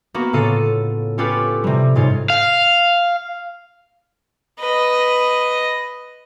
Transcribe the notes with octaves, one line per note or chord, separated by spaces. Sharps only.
A#3 B3 F#4
A2 C#3 F4 A4 D#7
C#4 F4 G4 A4 B4
C3 G3
G#2 C3 F4 C#5
F5
B4 D#5